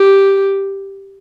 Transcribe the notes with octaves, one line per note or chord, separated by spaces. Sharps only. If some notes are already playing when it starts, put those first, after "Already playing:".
Already playing: G4